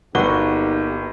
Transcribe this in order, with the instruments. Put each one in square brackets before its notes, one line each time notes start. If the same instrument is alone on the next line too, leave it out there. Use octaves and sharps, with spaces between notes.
[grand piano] G1 G7 [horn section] A#3 B3 G4 [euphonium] D#4 [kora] F#4